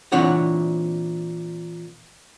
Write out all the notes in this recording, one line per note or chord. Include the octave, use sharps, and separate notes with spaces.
A#2 E3 C4 D4 C#5 F#5